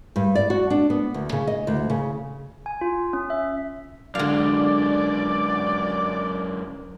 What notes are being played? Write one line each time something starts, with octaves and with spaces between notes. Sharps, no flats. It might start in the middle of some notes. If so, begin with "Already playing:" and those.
G2
D5
F#4
D4
B3
D2
C#3
D#5
D2
C#3
G#5
F4
C#4
E5
F#2 D3 G#3 D5 F5